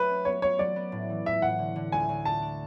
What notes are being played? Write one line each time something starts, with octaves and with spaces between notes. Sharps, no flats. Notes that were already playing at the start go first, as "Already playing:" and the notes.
Already playing: F#3 A3 B4
C#4
B3 C#5
B3 C#5
F#3 D5
B3
A2
E3
A2 E5
A2 F#5
D3
D3
D2 G#5
D2
D4 A5
D4